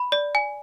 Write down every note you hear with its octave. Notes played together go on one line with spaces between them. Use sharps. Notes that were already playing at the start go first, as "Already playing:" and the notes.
Already playing: B5
D5
G#5